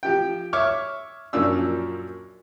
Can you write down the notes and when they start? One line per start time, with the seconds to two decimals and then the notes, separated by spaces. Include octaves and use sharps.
0.03 F3 G4 G5
0.53 C#5 E5 C#6 D6 F6
1.33 F#2 A#2 F3 C#4 D4 E6